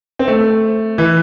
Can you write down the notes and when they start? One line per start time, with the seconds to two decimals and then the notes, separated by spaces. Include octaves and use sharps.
0.19 C4
0.28 A3
0.98 E3